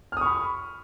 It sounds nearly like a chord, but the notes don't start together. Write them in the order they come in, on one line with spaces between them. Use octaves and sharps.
F6 D#6 C#6 B5